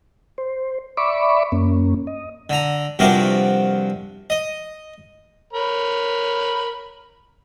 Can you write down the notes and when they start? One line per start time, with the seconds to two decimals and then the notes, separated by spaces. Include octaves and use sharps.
0.38 C5
0.97 D5 E5 B5 C#6 D6
1.52 F#2 A#3 C#4
2.07 D#5
2.50 D3 A#5
2.99 G2 C3 F3 F#4 A#4 D6
4.30 D#5
5.53 A#4 C#5 B5